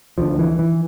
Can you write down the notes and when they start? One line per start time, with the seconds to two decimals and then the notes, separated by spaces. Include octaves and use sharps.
0.18 D2 D3 F3
0.39 E3
0.59 E3